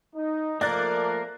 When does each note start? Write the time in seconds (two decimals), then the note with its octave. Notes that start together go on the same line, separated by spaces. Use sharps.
0.15 D#4
0.61 F3 A3 A#3 A#4 D5 F#6 A6